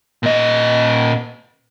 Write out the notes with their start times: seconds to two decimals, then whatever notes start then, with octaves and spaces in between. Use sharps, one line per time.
0.23 A#2 D#5